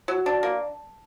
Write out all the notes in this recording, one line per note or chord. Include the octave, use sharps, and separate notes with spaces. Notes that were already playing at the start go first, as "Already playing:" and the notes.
F#3
D4
A#3